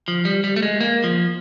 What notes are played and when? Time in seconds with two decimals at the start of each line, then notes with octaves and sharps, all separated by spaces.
0.08 F3
0.25 G3
0.44 G3
0.56 A3
0.63 G#3
0.80 A#3
1.04 F3